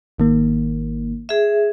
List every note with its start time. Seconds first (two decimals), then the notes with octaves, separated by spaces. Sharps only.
0.18 G#1 D#3 A#3
1.29 G#4 E5